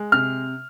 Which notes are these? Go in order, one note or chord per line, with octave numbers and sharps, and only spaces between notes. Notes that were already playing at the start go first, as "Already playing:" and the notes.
Already playing: G#3
C3 F6